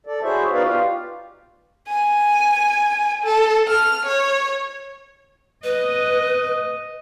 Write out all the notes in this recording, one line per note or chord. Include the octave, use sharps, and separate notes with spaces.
A4 D5
E4 F#4 G#4 C5 C#5 E5
B3 D#4 F#4 B4 D5 F5
F4 G4 F5
G#5
A4
F6
C#5
B4 D#5